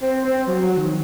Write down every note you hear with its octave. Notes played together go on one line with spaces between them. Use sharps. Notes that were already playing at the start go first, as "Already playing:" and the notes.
C4
C4
F#3
F#3
D#3